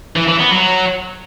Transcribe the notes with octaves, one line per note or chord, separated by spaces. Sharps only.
E3
E3
B3
F#3